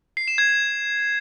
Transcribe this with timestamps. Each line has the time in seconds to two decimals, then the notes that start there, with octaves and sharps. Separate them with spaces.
0.17 C7
0.28 E7
0.38 G#6